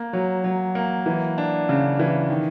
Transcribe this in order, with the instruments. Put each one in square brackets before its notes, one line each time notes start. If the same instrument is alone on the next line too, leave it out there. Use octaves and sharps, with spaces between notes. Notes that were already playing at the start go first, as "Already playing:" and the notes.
Already playing: [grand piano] A#3
F#3
F#3
A#3
E3
D4
C#3
E3
D#3